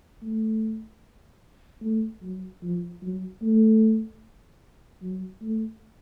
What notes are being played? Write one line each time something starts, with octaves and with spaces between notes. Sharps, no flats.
A3
A3
F#3
F3
F#3
A3
F#3
A3